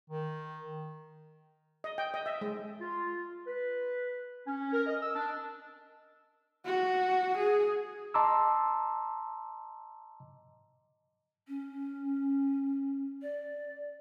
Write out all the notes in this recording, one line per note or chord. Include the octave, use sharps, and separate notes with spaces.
D#3
D#5
G5
D#5
E5
G#3
F4
B4
C#4
A#4
D#5
E6
D4
F#4
G#4
D#5 A5 A#5 C6 D6 E6
C#4
D5